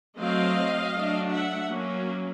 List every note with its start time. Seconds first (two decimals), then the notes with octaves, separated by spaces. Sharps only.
0.18 F#3 A3 C4 D#5 F5
0.94 F#3 A3 D4
1.31 E5 F#5
1.69 F#3 A#3 C#4